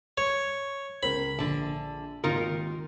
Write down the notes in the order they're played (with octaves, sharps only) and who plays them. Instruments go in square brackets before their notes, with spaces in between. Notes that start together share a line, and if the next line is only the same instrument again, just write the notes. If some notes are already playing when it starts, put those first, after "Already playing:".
[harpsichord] C#5
[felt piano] C#2 A#4 C5 [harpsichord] B5
[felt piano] A#1 [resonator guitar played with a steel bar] D3 A5
[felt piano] G#1 D#2 [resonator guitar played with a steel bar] D#4 F4 A#4